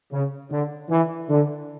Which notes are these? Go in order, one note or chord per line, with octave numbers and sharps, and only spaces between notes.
C#3
D3
E3
D3